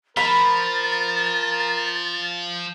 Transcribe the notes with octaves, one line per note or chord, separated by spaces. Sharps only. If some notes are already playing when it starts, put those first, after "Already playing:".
F3 A#4 B5 A6